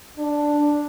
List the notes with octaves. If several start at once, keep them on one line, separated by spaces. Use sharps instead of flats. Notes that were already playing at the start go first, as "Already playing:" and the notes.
D4